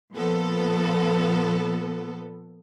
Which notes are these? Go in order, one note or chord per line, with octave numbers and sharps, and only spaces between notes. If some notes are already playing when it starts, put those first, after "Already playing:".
A#2 F3 B3 A4